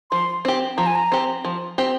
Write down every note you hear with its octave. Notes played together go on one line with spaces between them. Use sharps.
F3 C6
C4 G4
F3 A#5
G#5
A#5
C4 G4
F3
C4 G4